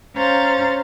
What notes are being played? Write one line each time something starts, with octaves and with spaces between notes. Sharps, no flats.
C#4 C5 F5 A#5 A6